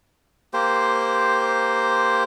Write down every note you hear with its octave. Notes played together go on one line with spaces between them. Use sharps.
A#3 G4 C5